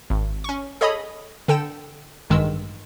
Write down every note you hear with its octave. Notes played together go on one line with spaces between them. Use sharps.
G#1
C#4 C#6
G#4 A4 C#5 D#5 B5 D#6
D3 A4 G5 E7
A1 G2 D#3 G#3 E6